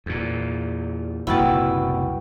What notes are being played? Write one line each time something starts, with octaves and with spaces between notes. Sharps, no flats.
E2 A#2
F#1 C2 A#2 E4 F#4 B4 G5 A5